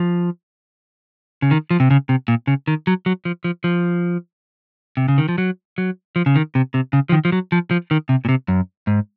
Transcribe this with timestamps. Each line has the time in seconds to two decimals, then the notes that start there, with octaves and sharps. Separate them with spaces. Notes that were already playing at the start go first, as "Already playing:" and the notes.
Already playing: F3
1.42 C#3
1.51 D#3
1.71 F3
1.80 C3
1.91 C#3
2.09 C3
2.28 A#2
2.47 C#3
2.68 D#3
2.87 F#3
3.06 F#3
3.25 F3
3.44 F3
3.64 F3
4.97 C3
5.08 C#3
5.18 D#3
5.29 F3
5.38 F#3
5.78 F#3
6.16 F3
6.26 C#3
6.36 D#3
6.55 C3
6.74 C3
6.93 C#3
7.09 F3
7.12 D#3
7.25 F3
7.32 F#3
7.52 F3
7.71 F3
7.91 D#3
8.09 C3
8.25 A#2
8.29 C3
8.48 F#2
8.87 G#2